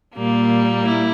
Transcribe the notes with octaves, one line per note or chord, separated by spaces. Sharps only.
A#2 G3 A#3
E4